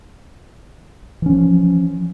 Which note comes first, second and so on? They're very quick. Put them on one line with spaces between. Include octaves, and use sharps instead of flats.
E3 C#4 F3